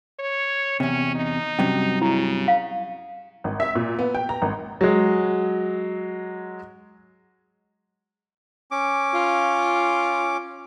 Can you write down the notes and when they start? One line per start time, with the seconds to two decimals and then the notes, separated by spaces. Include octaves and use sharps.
0.20 C#5
0.80 E2 C3 C#4
1.15 D#4
1.59 G2 C3 F#3 C#4
2.02 C#3 E4
2.48 F5
3.44 G#1
3.60 E5
3.75 A#2
3.99 B3
4.15 G5
4.29 A#5
4.42 G#1
4.81 F#3 G#3
8.71 C#4 D6
9.14 F4